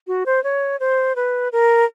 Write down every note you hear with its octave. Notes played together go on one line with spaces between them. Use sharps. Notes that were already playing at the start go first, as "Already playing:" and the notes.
F#4
C5
C#5
C5
B4
A#4